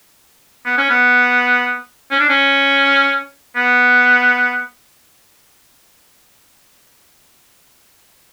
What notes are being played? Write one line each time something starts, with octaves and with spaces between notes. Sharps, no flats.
B3
C#4
B3
C#4
D4
C#4
B3